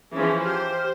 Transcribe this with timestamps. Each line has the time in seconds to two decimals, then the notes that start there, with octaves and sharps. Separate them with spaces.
0.14 E3 F3 C#4 G#4 E5
0.44 G4 C5 F6